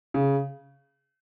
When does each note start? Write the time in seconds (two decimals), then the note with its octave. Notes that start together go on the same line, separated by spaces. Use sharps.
0.14 C#3